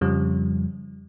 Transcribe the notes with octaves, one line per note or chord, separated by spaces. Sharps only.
F2 C#3 F3 G3